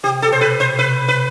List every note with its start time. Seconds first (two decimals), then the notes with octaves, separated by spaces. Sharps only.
0.04 C3 G4
0.22 A4
0.29 B2 C5
0.41 B4
0.60 C5
0.79 C3 B4
1.08 B4